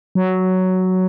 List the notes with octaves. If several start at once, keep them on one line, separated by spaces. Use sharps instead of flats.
F#3